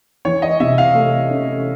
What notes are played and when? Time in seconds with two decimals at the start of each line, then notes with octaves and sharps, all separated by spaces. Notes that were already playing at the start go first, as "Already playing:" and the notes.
0.25 E3 C#5
0.42 D#5
0.60 C3 E5
0.78 F5
0.95 A3
1.30 C#4